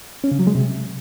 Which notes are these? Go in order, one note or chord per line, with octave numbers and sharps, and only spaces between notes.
C#4
C#3
F#3
G#3
C3